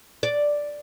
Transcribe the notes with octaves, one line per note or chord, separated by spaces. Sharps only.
D5